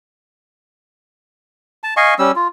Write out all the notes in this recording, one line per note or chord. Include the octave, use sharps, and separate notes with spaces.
A5
D#5 F5 G#5 C#6
G3 C#4 E6
F4